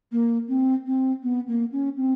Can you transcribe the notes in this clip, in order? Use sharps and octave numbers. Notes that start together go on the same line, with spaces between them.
A#3
C4
C4
B3
A#3
C#4
C4